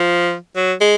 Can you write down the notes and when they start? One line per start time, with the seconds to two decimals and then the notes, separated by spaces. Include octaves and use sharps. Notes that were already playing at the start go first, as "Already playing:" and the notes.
Already playing: F3
0.56 F#3
0.81 G#3